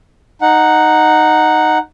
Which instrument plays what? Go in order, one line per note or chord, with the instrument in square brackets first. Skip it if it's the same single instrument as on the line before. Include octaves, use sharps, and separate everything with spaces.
[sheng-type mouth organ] D#4 F#5